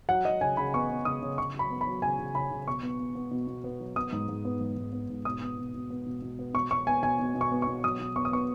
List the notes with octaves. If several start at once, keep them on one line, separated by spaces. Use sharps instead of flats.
F#3 F#5
F#3 D#5
C#3 G#5
C#3 B5
B3 C#6
B3
C#3 D#6
C#3
C#3 C#6
F#3
B5
B3
B5
F#3
C#3 G#5
C#3
C#3 B5
C#3
B2 C#6
B3
B3
B3
B2
B2
B3
F#3
B3 D#6
G#2
G#2
B3
G#2
G#2
B3
G#2
B2 D#6
B3
B2
B2
B3
B2
B2
B3
B2 C#6
B2 C#6
B3 G#5
B2 G#5
B2
B2
C#6
B3
C#6
B2
F#3 D#6
B2
B3 C#6
D#6
B3 C#6